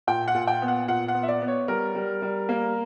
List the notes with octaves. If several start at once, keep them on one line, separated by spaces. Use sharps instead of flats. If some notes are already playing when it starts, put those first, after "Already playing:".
A#2 G5
F#5
A#2
G5
B3
F#5
A#2 F#5
F#5
B3
E5
D5
B3
C#5
G3 A#4
G3
G3
A#3